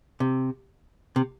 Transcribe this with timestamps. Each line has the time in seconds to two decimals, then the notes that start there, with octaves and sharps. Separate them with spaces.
0.20 C3
1.16 C3